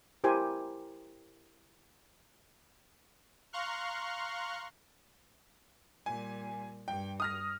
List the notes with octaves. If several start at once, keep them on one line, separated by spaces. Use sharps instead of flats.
E4 G4 A#4 C5 G#5
F5 A#5 C6 C#6 F6 F#6
A#2 G3 G#5
G2 G5
D#6 F6 A#6